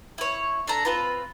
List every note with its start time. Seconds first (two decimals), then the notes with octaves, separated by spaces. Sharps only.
0.18 E4 C#5
0.67 D4 A4 A#5
0.85 C4 F4 B4